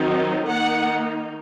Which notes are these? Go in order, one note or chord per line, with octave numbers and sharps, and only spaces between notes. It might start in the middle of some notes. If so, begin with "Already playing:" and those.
Already playing: D#3 F#3 C4 D#4
D#3 A#3 D#4 F#5